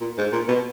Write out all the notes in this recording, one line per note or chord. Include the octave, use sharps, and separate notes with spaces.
A#2
G#2
A#2
B2